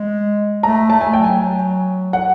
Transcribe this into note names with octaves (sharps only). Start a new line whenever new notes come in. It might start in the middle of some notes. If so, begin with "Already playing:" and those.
Already playing: G#3
A3 A#5
A3 A5
G#5
F#3 G5
G#5
F#5